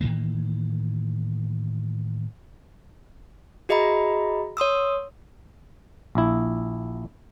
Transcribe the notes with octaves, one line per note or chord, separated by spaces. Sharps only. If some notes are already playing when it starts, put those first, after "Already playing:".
A2 D#3 E3 A#3
F#4 G#4 D#5 E5 A#5 B5
C#5 C6 D#6 E6
A#1 E4